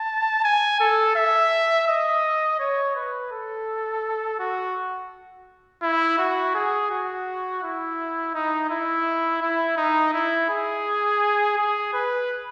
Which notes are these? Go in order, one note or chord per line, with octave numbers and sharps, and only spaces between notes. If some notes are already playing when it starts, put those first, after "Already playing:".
Already playing: A5
G#5
A4
E5
D#5
C#5
B4
A4
F#4
E4
F#4
G#4
F#4
E4
D#4
E4
E4
D#4
E4
G#4
G#4
B4